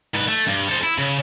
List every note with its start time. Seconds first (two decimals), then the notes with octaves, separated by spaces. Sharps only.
0.14 G#2 B4
0.28 A3
0.47 G2
0.68 A4 C5
0.83 E4
0.98 C#3